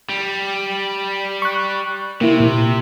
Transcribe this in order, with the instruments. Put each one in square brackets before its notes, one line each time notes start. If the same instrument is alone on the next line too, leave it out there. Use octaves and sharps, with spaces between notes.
[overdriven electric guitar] G3
[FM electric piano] C#6 F#6
[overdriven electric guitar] C3 [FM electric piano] A#3 E4
[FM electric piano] A#2